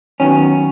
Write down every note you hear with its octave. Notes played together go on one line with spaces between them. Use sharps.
D#3 F#3 B3 C#4